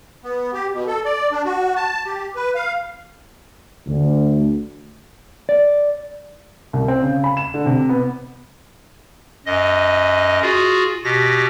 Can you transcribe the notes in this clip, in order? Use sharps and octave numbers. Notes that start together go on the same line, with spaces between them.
B3
G4
B2
A4
D5
D4
F#4
A5
G4
B4
F5
D2
D5
C2
C4
C#3
B5
E7
D3
C3
B3
F#2 D#5
F4 F#4 G#4
B2 G4 A#6